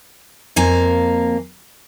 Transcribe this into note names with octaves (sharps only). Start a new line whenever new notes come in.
F2 A#3 G#5 A#5